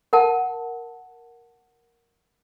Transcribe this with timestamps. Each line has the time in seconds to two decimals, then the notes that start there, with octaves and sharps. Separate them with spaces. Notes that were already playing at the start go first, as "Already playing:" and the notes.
0.13 A#4 F#5 A5